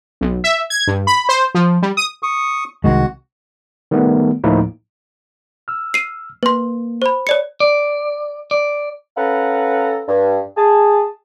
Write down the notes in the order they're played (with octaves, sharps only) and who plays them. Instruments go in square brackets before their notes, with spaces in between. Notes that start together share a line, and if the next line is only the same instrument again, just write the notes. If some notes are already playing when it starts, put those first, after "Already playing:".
[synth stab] B1
E5
G#6
G2
B5
C5
F3
G3
D#6
[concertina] C#6 D#6
[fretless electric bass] C2 D#3 G#3 [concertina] F#4
[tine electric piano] D#3 G3 A3 B3
D2 A2 F3 A#3 D#4 E4
E6 F6
[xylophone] C7 D#7
[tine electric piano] A#3 [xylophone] B4 C6
[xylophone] C5 B5
C#5 D5 C#7
[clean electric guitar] D5
D5
[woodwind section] C#4 A4 B4 F5 F#5 A#5
G2
G#4 A5